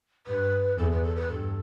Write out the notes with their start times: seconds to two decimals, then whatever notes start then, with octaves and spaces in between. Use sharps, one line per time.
0.26 G2 B4
0.78 E2 A4
0.91 B4
1.03 A4
1.16 B4
1.29 G2 A4